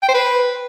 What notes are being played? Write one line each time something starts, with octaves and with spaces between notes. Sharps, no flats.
G5
C5
B4